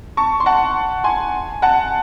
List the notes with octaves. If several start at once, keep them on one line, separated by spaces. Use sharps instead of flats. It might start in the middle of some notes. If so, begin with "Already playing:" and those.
A5 C#6
C6
F#5 A5
G#5 C6
F#5 A5